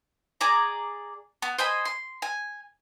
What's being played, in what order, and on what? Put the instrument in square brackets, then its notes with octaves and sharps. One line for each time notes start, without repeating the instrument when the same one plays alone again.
[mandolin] G#4 D5 A#5
B3
C5 D#5 G#5 B5
C6
G#5